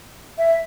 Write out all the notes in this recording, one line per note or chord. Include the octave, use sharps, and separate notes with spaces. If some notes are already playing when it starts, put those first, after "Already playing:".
E5